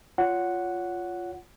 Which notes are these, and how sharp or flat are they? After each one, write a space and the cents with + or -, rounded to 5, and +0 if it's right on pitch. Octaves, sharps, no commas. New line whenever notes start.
F4 +0 C#5 +25 F#5 +0